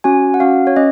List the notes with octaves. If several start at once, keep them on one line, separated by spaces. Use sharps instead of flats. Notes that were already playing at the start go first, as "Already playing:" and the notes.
C#4 F#4 G#5
F#5
C#4 F#4 F5
C#5
C#4 D#5